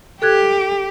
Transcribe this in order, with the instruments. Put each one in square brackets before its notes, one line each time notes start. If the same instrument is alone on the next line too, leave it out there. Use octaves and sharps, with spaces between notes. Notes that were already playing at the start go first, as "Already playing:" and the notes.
[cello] G4 [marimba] A4 F#6 G#6